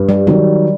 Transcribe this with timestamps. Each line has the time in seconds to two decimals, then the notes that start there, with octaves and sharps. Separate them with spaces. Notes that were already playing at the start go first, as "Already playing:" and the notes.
Already playing: G2
0.09 G3
0.27 D#3 F#3 G3